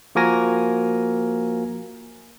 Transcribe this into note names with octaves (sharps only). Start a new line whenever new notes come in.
F3 A#3 F#4 A#4 G#5 A#6